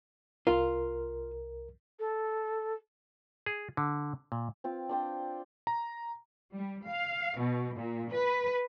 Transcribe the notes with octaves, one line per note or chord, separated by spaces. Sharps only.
C2 F4 A#4
A4
G#4
D3
A#2
C4 F4 F5
D4 C5 G5
A#5
G3
F5
B2
A#2
B4